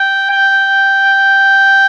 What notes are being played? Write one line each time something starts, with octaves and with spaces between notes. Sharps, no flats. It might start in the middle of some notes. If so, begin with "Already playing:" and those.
Already playing: G5
G5